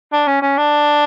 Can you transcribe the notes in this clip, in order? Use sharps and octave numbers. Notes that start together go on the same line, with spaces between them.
D4
C#4
C#4
D4